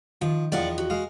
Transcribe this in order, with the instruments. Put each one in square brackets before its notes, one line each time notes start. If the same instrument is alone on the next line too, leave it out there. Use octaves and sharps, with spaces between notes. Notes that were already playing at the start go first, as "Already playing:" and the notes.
[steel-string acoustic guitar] D#3 [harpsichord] F3
[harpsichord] E2 D#3 F3 [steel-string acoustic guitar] D5 F5 F#5
[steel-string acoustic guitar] F#4
[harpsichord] G#3 F5